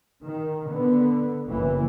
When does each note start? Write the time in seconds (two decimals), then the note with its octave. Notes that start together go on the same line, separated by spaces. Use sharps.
0.24 D#3
0.70 D3 B3
1.49 F#1 E3